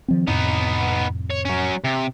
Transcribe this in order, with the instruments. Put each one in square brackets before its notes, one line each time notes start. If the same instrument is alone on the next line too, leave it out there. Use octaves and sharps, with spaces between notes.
[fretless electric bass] D#3 F3 C4
[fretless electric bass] F2 A2 C3 [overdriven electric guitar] B3 D#4
[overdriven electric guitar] C#5
F#3 C#4
C3